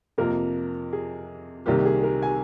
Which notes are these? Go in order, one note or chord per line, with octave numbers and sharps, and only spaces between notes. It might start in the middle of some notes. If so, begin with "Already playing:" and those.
F2 C3 F3 A#3 A#4
G#4
C2 C3 D#3 G3 A#3 G4
G#4
A#4
G#5